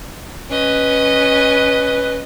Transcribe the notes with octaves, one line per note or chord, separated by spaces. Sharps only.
C#4 B4 D#5